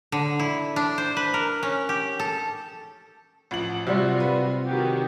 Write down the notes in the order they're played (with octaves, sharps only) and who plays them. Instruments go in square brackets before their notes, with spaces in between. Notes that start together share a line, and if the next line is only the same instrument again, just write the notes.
[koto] D3
E4
D4
C5
B4
A#4
C#4
G4
A4
[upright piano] A1 F3 F#7
[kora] C3 G3 [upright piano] F#3 [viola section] F4 F#4
[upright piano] B4
[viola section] D#3 F#4 G4